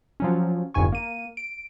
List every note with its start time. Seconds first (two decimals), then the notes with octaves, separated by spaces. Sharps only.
0.20 F3 F#3 C#4
0.74 G1 F2 G#2 G#5 C#6
0.93 A#3 D#7
1.37 D7